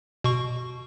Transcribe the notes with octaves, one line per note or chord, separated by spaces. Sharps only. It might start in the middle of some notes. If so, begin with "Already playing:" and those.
B2 C#6